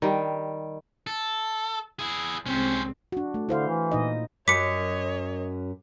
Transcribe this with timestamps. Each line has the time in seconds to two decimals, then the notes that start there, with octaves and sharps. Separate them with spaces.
0.02 D#3 G3
1.07 A4
1.99 E4 G#4
2.46 C2 G#3 C4 C#4 C5
3.12 D4 F#4
3.34 A3
3.49 D3 E4 C5 F5
3.67 E3
3.91 A#2 D#4 D#5
4.48 F#2 C#5 D#5 D6 B6 C#7